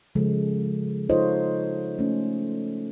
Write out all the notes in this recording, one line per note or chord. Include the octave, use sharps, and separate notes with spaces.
C#3 F3 G#3 A4
D#4 F4 A4 C5 C#5 D#5
A3 C#4